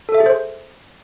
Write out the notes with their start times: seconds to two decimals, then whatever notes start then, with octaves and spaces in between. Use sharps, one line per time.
0.09 A4
0.14 E5
0.20 G#4
0.26 C5